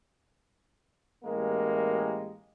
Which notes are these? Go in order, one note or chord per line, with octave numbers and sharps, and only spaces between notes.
A1 G#3 A#3 G4 A#4